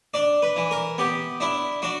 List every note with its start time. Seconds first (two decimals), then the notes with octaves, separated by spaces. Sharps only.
0.14 D4 D5
0.42 B4
0.56 E3
0.71 A#4
0.98 B3 G4
1.40 D4 E4
1.82 D4 F#4